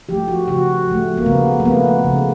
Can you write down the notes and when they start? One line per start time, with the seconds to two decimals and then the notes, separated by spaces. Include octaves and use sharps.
0.09 F3 A3 G4
0.28 F#4
0.48 C#3 F#4
0.88 F3 A3
1.18 A#3
1.26 C#3 B3
1.60 A#3
1.65 F3 A3 B3
2.04 C#3